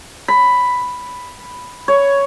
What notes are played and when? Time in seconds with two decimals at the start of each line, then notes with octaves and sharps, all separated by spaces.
0.28 B5
1.88 C#5